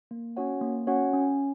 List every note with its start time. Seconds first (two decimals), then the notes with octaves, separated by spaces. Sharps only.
0.11 A#3
0.37 C#4 F#4 C#5 F#5
0.61 A#3
0.87 C#4 F#4 C#5 F#5
1.13 C#4